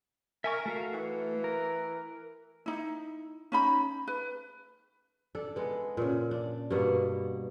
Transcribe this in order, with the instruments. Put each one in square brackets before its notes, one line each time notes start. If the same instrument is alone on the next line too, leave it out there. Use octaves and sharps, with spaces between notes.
[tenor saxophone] A#4 [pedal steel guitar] E5 G#5 C#6
[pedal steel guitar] A3 F#4 F5
[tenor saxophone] E3
[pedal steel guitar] A#4
[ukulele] D#4 E4
C#4 D#4 B5
B4
[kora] D4 A4
G#3 B3
A#2 C#3
D4
G2 B2 A#3 B3